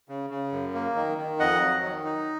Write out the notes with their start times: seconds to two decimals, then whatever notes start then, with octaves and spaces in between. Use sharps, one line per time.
0.09 C#3
0.30 C#3
0.52 F#2
0.74 A#3
0.96 D#3
1.18 D#3
1.40 F2 D#5 F#5
1.61 F#3
1.83 D#3
2.05 D#4